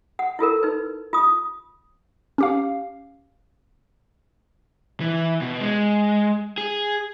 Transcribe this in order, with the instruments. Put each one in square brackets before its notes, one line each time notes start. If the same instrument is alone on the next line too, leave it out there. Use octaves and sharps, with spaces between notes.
[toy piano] F#5
E4 F4 A4 A#4
D#4 B4
F4 D#6
[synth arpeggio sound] C#4 G4 F5
[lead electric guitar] E3
B2
G#3
G#4